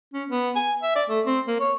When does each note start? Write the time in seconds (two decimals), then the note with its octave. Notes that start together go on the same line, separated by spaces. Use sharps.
0.13 C#4
0.29 B3
0.56 G#5
0.82 E5
0.96 D5
1.09 A3
1.26 C4
1.47 A#3
1.60 C#5